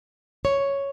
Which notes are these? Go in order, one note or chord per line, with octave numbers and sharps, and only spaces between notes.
C#5